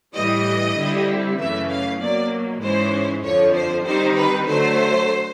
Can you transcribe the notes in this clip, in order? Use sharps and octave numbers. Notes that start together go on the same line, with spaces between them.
A2 E3 G3 D#5
D3 G3 C4 E4
F#2 C#3 E3 A3 C#4 E5
F5
B2 F#3 A#3 D5
G#2 E3 G#3 C#4 C5
F2 D3 F3 C#5
C5
D#3 G3 C4 D#4 C5
B4
D3 F#3 A3 C5